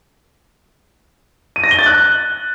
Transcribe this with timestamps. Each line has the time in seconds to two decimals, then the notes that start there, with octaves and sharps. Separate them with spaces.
1.56 D#7
1.64 A#6
1.71 G7
1.79 A6
1.86 F#6